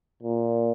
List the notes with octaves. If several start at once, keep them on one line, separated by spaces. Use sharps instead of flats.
A#2